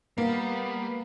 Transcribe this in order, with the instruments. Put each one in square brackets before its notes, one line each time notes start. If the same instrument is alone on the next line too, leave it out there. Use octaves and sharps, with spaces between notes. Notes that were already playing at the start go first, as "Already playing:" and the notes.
[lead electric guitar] G3 [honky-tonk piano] A#3 [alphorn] B3